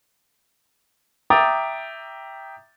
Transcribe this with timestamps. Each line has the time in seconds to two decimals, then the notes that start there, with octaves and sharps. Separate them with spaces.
1.30 E5 G5 A#5 D6 D#6 A6